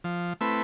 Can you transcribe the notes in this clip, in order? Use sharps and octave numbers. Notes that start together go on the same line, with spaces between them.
F3
A3 C4 E4 B4